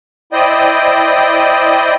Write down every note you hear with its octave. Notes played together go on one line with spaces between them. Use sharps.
E4 C5 D5 D#5 G5 D#6